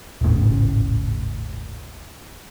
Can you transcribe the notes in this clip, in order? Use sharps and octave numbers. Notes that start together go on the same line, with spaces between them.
D#1 G#1 A2 C#3